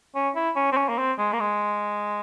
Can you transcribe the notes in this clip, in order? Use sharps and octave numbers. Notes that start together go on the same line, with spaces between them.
C#4
E4
C#4
C4
C#4
A#3
C4
G#3
A#3
G#3